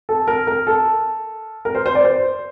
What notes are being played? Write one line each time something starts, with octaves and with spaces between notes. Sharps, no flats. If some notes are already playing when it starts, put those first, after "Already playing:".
A4
A#4
A#4
A4
A#4
C5
C5
D5
C5